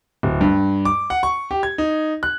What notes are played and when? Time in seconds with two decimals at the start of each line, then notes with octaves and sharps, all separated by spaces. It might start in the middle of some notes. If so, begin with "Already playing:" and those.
0.23 D1
0.41 G2
0.85 D6
1.10 F#5
1.23 C#6
1.51 G4
1.63 G#6
1.78 D#4
2.23 F#6